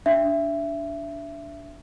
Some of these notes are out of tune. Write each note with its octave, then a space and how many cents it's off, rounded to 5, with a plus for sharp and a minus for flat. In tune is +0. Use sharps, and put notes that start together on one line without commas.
D4 -15 E5 +20